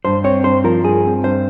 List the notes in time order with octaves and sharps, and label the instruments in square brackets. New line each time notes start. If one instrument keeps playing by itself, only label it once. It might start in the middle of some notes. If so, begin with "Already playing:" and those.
[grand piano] G2 [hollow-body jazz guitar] C5
[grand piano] C4 [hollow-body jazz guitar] C#5
[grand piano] G2 [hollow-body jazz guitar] C5
[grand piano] F3 [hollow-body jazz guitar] A#4
[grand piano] G2 [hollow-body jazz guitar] G#4
[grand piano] C4
[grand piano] G2 [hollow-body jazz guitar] C5